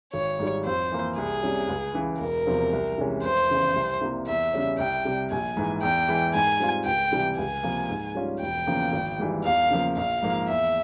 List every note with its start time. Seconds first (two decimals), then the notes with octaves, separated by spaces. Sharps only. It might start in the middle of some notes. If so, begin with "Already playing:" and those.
0.14 G#1 C#5
0.39 G#2 G3
0.65 F2 C5
0.92 E3 A#3
1.17 C2 G#4
1.43 C3 G3 C#4
1.69 C#2
1.94 C#3 E3
2.20 E1 A#4
2.47 E2 C3 F3 C4
2.73 C2
2.98 C3 E3 G#3 C#4
3.24 F1 C5
3.50 E2 C#3 E3
3.75 C2
4.01 C3 G3 A#3 E4
4.27 E2 E5
4.54 C#3 G3 C#4
4.79 C2 G5
5.05 C3 G3
5.31 A#1 G#5
5.57 G#2 E3
5.83 E2 G5
6.08 E3 G#3 E4
6.34 G#2 G#5
6.60 G3 C4 F4
6.86 C#2 G5
7.12 C3 E3 G3
7.38 C#2 G#5
7.63 C3 F3 A#3
7.89 G#2
8.15 G3 C#4 F4
8.41 E1 G5
8.67 E2 C#3 F3 A#3
8.93 G#1
9.19 G#2 E3 G3
9.44 E2 F5
9.71 C#3 F3 A#3
9.97 A#1 F5
10.22 G#2 F3 A#3
10.48 E2 E5